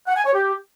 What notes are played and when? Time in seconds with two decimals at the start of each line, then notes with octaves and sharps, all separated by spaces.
0.07 F#5
0.16 G#5
0.26 C#5
0.35 G4